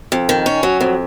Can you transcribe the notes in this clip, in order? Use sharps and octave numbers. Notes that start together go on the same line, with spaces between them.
F2
D#3
C#4
F#3
F2